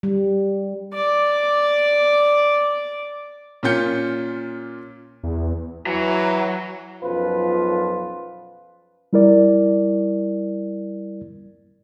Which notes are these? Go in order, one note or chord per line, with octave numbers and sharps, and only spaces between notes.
G3
D5 D6
A#2 C#4 F4 G6 C#7
E2
E3 F#3
B1 F#2 F3 F4 B4
G3 E4 A#4 D5